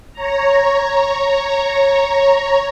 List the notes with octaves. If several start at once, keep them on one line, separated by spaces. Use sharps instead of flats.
C#5 A#5